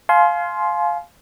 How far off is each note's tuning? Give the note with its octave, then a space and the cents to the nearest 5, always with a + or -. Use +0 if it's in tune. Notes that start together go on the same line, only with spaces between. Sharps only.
F5 +0 G#5 +40 C6 +0